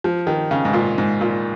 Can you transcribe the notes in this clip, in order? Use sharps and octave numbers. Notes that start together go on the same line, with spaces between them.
F3
D#3
C#3
G#2
A#2
G#2
A#2